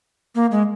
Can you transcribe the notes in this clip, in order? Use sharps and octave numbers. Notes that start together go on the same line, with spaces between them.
A#3
G#3